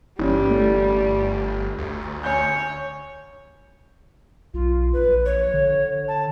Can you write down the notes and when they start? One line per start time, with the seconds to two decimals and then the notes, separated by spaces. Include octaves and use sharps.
0.19 G1 E3 G3 C#4
0.49 A3 A4
1.78 D2
2.24 C#5 G#5 G6
4.54 B1 F4
4.93 A#1 B4
5.26 C#5
5.54 D3
6.08 A5